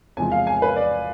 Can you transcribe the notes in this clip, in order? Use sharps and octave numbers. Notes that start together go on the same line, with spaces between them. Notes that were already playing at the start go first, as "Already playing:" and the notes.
E2 C3 F3 G#3 G#5
F5
G#5
B4
D5